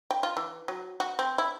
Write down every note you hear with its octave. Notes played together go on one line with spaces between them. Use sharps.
G5
F4
E3
F#3
F#4
C4
E4